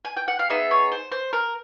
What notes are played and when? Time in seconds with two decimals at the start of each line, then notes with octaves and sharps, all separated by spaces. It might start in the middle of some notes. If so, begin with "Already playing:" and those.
0.05 G#5
0.17 G5
0.28 F#5
0.39 F5
0.50 B3 D#4 G#4 E5
0.71 C#5
0.92 C5
1.12 C5
1.33 A#4